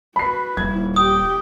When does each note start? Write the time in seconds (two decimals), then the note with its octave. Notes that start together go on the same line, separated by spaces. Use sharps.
0.16 F#4 B4 B5 C7
0.57 D#1 E4 G#6
0.96 G4 G5 D#6